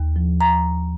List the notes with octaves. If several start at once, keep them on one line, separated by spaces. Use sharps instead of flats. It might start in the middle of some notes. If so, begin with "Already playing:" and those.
Already playing: D#2
F3
A#5